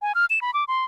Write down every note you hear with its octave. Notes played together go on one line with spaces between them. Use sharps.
G#5
F6
E7
B5
D6
C6